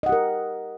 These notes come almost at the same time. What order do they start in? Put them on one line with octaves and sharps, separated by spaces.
D#5 F#5 G4 A#4